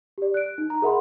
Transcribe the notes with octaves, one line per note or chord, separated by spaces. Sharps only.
G4 D5
F#6 D7
D#4
A#5
G#4 A#4 E5 F#5 B5 C6